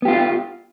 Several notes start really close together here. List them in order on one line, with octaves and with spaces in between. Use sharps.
B3 G4 F4